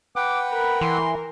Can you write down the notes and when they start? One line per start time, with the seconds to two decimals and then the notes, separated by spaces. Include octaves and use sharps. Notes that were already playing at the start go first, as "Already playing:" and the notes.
0.16 B4 F#5 G5 D6
0.53 A#4 B5
0.81 E3 C6